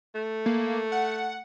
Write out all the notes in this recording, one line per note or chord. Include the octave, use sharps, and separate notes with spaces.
A3
A#3
F#5